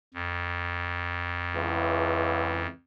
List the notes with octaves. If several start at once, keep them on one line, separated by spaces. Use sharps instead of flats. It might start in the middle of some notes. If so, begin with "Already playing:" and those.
F2
C#2 E3